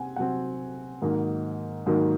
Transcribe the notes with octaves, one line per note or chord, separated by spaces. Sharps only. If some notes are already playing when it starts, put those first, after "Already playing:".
Already playing: C3 C4 F#5 G#5
C3 F#3 C4 F#5
G#2 D#3 F#3 A#3
G#2 D#3 F#3 A#3